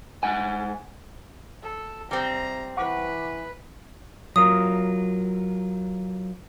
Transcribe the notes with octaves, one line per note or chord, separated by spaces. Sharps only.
G#2 F#5 G#5
A4
C3 G3 C4 A#5
E3 B4 F#5 C#6 D6
F#3 F4 A#4 D#6